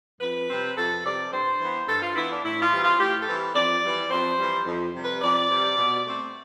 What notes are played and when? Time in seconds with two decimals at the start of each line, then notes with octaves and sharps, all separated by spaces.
0.21 F2 B4
0.49 C3 G3 C4
0.77 F2 A4
1.05 C3 G3 C4 D5
1.32 G2 C5
1.60 E3 B3
1.88 G2 A4
2.02 F4
2.16 E3 B3 E4
2.30 D4
2.44 A2 E4
2.62 F4
2.72 E3 G3 C4
2.81 F4
2.99 A2 G4
3.18 A4
3.28 E3 G3 C4
3.55 F2 D5
3.83 E3 G3
4.10 F2 C5
4.39 E3 G3
4.66 F2
4.94 C3 G3
5.03 B4
5.22 F2 D5
5.50 C3 G3
5.77 B2
6.06 A3 C4